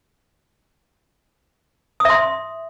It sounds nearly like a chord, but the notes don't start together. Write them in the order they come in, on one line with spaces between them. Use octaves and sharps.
D#6 E5 C6